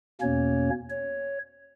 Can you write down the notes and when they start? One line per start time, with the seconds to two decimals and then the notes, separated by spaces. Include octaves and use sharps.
0.21 E2 B2 A#3 C#4 C#5
0.90 C#5